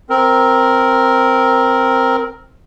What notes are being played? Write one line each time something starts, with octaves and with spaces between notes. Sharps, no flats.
C4 A#4